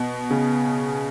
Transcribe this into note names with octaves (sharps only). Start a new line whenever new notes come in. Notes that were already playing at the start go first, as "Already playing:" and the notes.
Already playing: B2
C#3